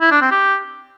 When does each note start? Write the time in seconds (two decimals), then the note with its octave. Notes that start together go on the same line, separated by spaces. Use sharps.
0.01 E4
0.11 D4
0.21 C4
0.31 G4